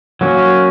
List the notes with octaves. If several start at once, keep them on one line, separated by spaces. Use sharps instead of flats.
F#3 A#3 C#4